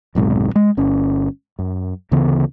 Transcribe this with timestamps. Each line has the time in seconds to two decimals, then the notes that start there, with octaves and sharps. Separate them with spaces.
0.15 D#1 B1 G#2 C3
0.56 G#3
0.77 G1 C#4
1.59 F#2
2.11 D2 C#3 E3 B3